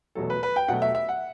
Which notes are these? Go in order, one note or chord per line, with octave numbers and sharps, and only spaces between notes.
E2 B2 F#3 A3 A4
B4
B4
G5
B2 F#3 A3 F#5
E5
E5
F#5